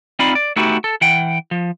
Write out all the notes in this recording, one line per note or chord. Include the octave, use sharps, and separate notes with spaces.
C4 D#4 F4 D5 F5 B5
D5
A3 B3 D#4 E4 F#4 G4
A4
E3 F#5 G5
F3